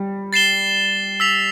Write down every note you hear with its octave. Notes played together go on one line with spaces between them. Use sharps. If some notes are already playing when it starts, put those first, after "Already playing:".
Already playing: G3
A6 C7 E7 G7
E6 B6 F7